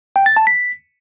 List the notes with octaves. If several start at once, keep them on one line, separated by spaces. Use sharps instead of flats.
G5
A6
A5
B6